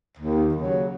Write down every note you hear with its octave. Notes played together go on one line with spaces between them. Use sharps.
D#2
C#3 F#3